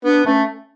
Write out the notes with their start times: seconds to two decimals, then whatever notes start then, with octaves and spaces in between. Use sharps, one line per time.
0.05 B3 D4
0.26 A3 C#4